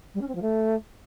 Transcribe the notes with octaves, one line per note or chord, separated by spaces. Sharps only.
G3
C#4
C4
F3
A3